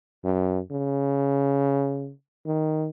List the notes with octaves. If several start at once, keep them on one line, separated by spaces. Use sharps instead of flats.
F#2
C#3
D#3